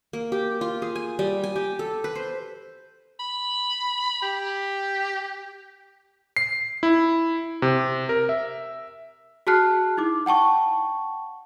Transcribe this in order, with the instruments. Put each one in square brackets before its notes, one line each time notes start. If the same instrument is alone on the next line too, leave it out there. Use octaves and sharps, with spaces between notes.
[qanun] A#3
G4
F4
G#4
G#5
G3
G#5
G4
A4
B4
C5
[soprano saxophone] B5
G4
[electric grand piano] C7
E4
C3
A#4
E5
[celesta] F#4 G#4 A5 F6 F#6 C7
D#4 E4 D6
F#5 G5 A5 C#6